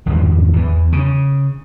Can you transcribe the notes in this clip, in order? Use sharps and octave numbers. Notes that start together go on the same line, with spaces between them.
G#1 E2 G2 F3
E2 E3
C#3